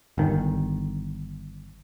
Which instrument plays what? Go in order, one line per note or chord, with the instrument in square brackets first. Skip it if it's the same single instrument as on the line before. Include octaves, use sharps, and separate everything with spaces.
[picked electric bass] G1 D#3